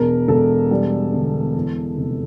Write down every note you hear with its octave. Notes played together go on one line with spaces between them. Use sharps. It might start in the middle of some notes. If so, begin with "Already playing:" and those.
Already playing: E1 A#4
E1 A4
G3
G1
E2
F1